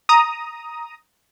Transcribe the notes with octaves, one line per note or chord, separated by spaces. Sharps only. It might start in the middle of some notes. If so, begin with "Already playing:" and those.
A#5 D#6